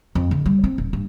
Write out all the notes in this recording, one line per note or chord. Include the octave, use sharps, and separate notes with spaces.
F2
D3
G3
C4
D#1
G2